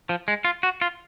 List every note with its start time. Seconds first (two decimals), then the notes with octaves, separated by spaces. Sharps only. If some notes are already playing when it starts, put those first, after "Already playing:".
0.09 F3
0.28 G#3
0.45 F4
0.63 F#4
0.81 F4